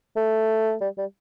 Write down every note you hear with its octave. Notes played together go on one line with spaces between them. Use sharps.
A3
G3
G3